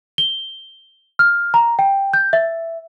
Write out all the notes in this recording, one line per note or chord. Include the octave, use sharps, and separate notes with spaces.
G7
F6
A#5
G5
G6
E5